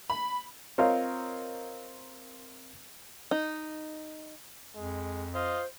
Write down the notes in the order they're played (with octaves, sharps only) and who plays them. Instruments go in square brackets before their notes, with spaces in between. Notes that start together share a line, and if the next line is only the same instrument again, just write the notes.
[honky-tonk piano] B5
[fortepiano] C4 F4 A#4 C#5 D#5 F5
[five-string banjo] D#4
[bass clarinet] F2 [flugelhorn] G#3
[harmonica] F4 D#5 [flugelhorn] C5